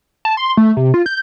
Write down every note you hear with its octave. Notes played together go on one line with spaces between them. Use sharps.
A5
C6
A3
C3
F4
G6